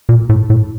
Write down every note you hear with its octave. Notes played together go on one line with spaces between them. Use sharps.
A#2
A2
A2